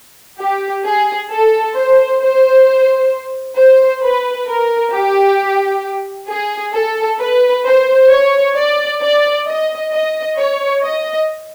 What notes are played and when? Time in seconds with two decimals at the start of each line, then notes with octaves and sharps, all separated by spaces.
0.39 G4
0.85 G#4
1.30 A4
1.75 C5
2.22 C5
3.57 C5
4.03 B4
4.48 A#4
4.93 G4
6.30 G#4
6.74 A4
7.21 B4
7.66 C5
8.11 C#5
8.57 D5
9.02 D5
9.48 D#5
9.93 D#5
10.38 C#5
10.84 D#5